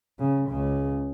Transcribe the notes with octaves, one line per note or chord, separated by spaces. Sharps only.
C#3
C#2 C#3